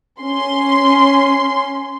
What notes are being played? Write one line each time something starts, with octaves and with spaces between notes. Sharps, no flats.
C#4 C6